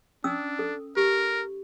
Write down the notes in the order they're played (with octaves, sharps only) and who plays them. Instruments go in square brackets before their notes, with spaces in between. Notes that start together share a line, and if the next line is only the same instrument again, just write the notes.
[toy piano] C#4 D#6 E6 [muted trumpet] D4
[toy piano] A4
[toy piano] G4 [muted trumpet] A#4